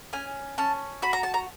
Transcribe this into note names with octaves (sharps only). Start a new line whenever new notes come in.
C#4 G#5
C#4 A5
F#4 B5
A#5
A5
A#5